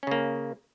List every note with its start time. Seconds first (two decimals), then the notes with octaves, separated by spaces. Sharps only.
0.03 C#4
0.07 C#3
0.11 A#3